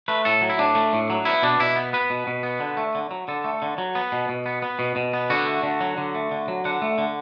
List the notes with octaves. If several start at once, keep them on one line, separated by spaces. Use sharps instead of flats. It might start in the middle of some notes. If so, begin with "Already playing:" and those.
A3 B4
A2 A4
F#3
E4
A2 D4
A3
A2
F#3
B3 E4
B2 D4
B2 E4
B3
B3 B4
B2
B2
B3
D3
A3
D3
F#3
D3 A4
A3
D3
F#3
B3
B2
B2
B3
B3
B2
B2
B3
D3 F#4
A3
D3
F#3
D3
A3
D3
F#3
D3 F#5
A3
D3